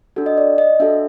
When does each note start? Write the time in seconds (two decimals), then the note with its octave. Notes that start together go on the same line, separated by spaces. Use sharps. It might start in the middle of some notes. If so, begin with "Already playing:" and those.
0.16 D4 F#4 A4
0.26 D#5
0.38 D5
0.58 D#5
0.80 D4 F#4 A4 E5